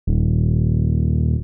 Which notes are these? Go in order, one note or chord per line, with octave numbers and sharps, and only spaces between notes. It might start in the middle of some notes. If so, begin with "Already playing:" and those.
D#1